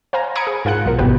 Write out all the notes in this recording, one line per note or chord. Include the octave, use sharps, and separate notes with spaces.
C5 F5 G#5 A#5
A#5 B5 D#6 G#6 C#7 D7
G#4
G#2 F4 A#4 F#5 F#6 C#7
B1 A#4
G#1 G#2 B2 B3 G4 B4